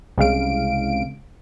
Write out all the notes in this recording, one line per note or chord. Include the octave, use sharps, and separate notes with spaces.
C2 C#3 G#3 F5 D7